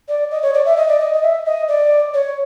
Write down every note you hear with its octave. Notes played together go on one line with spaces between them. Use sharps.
D5
D#5
C#5
D5
E5
D#5
D5
D#5
D#5
E5
D#5
D5
C#5